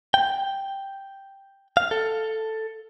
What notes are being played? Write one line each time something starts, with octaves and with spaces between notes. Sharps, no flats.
G5
F5
A4